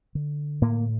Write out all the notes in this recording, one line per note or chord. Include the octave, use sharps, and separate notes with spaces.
D3
A2 A#3